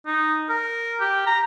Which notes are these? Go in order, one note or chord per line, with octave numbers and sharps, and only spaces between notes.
D#4
A#4
G4
A#5